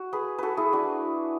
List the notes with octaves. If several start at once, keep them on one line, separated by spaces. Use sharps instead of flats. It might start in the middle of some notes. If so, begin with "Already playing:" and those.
Already playing: F#4
G#4 B4
F#4 A4 B4
E4 G#4
D4 F#4